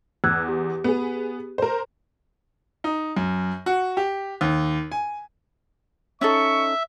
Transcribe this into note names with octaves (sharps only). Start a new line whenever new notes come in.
E2 E6 F#6 G#6
G4
B3 G#4
A#4 C5
D#4
F#2
F#4
G4
D#2
G#5
C#4 D#4 A4 E5 C#6